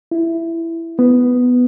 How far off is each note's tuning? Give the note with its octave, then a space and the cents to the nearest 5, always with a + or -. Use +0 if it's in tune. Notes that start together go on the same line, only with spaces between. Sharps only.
E4 +5
B3 +5